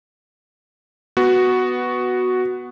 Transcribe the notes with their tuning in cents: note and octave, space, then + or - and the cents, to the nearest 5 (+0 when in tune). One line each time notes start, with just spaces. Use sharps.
B3 +0 F#4 +0